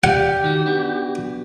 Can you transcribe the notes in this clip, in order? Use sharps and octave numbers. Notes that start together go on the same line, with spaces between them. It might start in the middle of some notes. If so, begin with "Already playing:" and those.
G4 D5 F5 F#5
D#3 D#4 F#4
B3 D4 F#4